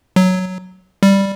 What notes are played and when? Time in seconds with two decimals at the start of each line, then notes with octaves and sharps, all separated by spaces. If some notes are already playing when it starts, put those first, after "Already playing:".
0.16 F#3
1.03 G3